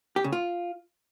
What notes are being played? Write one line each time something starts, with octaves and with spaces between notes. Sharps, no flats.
G4
C#3
F4